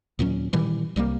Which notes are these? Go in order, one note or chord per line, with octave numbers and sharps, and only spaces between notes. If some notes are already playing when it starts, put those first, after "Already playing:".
D#2 A#2 F#3 C#4
A#2 D#3 E3 G3
C2 G3 G#3 A#3